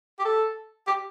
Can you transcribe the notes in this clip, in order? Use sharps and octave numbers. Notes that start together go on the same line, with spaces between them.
G4
A4
G4